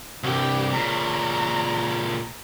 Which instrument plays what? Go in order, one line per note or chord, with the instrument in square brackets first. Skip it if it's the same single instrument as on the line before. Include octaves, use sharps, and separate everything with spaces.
[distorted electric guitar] C2 G2 [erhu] G4
[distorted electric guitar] A#2 C#3 [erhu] A#5